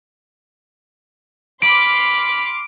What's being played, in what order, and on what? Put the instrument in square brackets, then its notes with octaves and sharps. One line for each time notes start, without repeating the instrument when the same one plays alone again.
[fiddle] B5 [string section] C6 D6 F6 [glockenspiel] D7